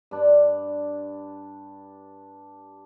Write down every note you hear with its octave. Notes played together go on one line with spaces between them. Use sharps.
G2 D4